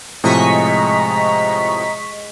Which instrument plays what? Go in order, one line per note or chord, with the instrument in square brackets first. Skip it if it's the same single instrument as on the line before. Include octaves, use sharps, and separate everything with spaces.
[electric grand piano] A2 C3 F3 [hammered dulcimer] G#3 [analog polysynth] D#5 C#6 B6 [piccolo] A#5